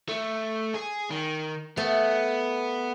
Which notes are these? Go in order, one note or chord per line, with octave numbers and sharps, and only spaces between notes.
A3
G#4
D#3
A3 B3